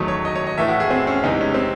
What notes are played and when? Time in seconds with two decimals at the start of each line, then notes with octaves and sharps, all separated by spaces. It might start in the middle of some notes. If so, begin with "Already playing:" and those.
Already playing: E2 D#3 F#3 A3
0.08 C#5
0.25 D#5
0.35 C#5
0.47 D#5
0.57 A2 E3 A3 E5
0.68 F#4
0.80 G#4
0.90 C4
1.07 C#4
1.24 E2 C3 E3 G#3 D#4
1.41 C#4
1.54 C4